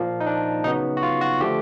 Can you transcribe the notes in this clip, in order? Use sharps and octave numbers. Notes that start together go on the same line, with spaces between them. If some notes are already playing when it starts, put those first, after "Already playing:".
Already playing: A#2 F3 A#3
D#4
D4
C#3 F#3 B3 D#4
F#4
F4
F#4
D3 F3 A3 G4